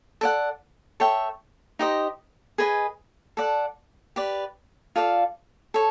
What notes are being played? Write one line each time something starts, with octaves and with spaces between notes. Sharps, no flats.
A4 D5 F#5
A4 C#5 E5 G5
D#4 G4 C5 D#5
G#4 B4 D#5 G#5
A4 D5 F#5
G4 B4 D5
F4 A4 D5 F5
A4 C#5